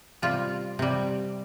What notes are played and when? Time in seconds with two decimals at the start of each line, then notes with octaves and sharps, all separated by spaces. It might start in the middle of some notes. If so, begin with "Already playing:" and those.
0.22 C3 G3 F4
0.79 C3 G3